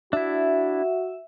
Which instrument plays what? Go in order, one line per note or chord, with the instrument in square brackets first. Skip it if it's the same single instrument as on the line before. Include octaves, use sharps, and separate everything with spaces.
[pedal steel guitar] D4 E4 [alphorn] F#4 [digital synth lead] E5